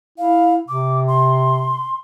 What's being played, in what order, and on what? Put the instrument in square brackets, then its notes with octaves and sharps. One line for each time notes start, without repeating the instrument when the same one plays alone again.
[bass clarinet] E4 [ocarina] F5
[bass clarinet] C3 [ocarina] D6
[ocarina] C6